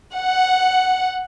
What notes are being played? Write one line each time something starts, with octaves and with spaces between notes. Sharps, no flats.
F#5